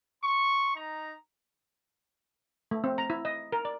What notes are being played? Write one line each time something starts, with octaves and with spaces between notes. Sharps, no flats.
C6 C#6
D#4 A#5
A3
C4
A#5
E4
D#5
A#4
D5